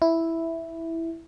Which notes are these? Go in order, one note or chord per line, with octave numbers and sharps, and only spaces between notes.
E4